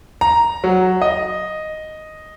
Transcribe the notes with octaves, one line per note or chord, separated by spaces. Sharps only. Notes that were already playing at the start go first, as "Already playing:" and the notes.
A#5
F#3
D#5